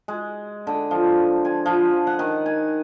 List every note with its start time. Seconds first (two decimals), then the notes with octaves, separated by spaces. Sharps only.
0.08 G#3
0.67 D3
0.91 F3
1.45 G#5
1.66 F3
2.07 F#5
2.19 D#3
2.46 G#5